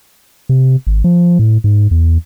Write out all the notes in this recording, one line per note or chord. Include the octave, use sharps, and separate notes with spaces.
C3
G#1
F3
A2
G#2
E2